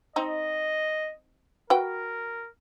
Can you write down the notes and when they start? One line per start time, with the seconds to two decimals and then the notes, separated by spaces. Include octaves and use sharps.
0.16 C4 D#4 D#5
1.70 F#4 A#4 B4 G5